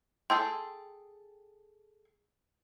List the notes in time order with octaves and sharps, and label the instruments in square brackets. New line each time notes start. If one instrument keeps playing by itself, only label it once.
[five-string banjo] G#4 A4 G5 [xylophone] C6